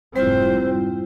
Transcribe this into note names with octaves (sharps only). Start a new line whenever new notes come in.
F1 G#2 G3 C4 E4 F4 C5